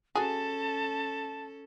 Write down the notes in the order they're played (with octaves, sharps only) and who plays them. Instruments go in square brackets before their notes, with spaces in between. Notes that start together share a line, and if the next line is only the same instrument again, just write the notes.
[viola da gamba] C#4 A4 [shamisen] F#4 G#4 [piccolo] A5